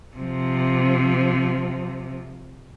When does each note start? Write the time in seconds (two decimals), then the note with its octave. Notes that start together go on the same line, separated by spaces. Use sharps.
0.17 C3 F3